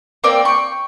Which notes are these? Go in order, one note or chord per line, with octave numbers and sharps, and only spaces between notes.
A#3 C4 D5 G5
G5 C#6